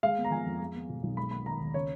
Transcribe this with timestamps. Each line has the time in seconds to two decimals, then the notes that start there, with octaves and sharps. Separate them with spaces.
0.03 G#3 F5
0.17 B3
0.24 A#5
0.31 F3 G#5
0.46 F2
0.60 G#3
0.75 B3
0.89 B2
1.03 B1
1.17 G#3 B5
1.31 B3 B5
1.46 D#3 A#5
1.60 D#2
1.74 C#3 C#5